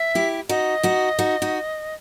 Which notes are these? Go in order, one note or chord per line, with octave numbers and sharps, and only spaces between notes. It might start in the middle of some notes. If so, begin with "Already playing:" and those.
Already playing: E5
E4 G4
D#4 F#4 D#5
D#4 F#4
D#4 F#4
D#4 F#4